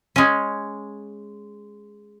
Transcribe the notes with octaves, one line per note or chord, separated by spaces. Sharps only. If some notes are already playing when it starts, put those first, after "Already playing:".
G#3 C#4